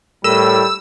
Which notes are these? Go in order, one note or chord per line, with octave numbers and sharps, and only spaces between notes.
A2 G3 A4 A#4 E6